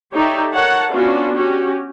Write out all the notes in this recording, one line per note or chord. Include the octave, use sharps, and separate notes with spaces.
D#4 G4 A4 C#5 D5 E5
A#4 C#5 F#5 A5
B3 C#4 D4 F4 F#4
C#4 F#4 G4